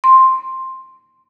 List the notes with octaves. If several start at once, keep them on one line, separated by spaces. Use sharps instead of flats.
C6